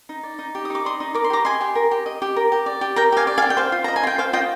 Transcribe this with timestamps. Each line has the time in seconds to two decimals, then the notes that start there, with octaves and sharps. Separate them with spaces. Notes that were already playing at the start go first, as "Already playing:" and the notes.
0.09 D#4
0.23 D5
0.39 D#4
0.55 G4
0.65 D#6
0.70 D#4 D6
0.85 D5 C6 D#6
1.00 D#4
1.14 A#4 D6
1.24 C6
1.30 G4 A#5 D6
1.45 D#5 G#5 C6
1.61 G4
1.75 A#4
1.91 G4
2.06 D#5
2.22 G4
2.36 A#4
2.52 G4
2.66 D5
2.81 G4
2.96 A#4 G5 A#5
3.12 G4 F5 G#5
3.27 D5
3.38 F5 G#5
3.42 G4
3.50 G5
3.57 C5 F5
3.72 F4
3.84 D#5 A#5
3.96 G#5
4.03 F4 G5
4.18 C5 F5
4.33 F4 D#5 G5